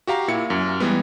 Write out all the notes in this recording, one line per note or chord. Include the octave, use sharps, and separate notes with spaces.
F#4 G4 F5 A#5
A#2 E4 C#7
F#2
E3 G3 G#3 B3